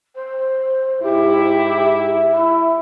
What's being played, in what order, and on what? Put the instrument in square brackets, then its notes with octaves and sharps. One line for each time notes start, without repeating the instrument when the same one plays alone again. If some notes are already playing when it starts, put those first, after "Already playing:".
[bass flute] C5
[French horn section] G#2 E4 [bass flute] G4
[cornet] E5
[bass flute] E4